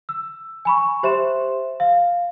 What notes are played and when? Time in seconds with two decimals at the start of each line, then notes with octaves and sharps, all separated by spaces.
0.09 E6
0.65 G#5 B5 C#6
1.03 G4 C5 E5 C6 E7
1.80 F5